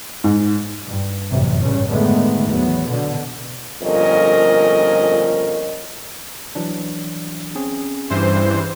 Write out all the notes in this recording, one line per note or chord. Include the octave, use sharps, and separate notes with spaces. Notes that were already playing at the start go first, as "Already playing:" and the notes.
G#2
G2
A1 F#2 C3 E3
G2 C#3 C#4
D3 D#3 G#3 A3 B3
E2 F#3 B3
B2 D3
G1 F2 A#2 C#4 A#4 D#5
E3 F#3 D4
C4 C#4 G#4
G2 E3 C5